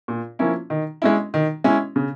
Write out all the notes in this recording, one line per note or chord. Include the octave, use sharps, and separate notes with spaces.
A#2
F3 A#3 C#4 E4
D#3
G#3 C#4 E4
D#3
G#3 C#4 E4
C#3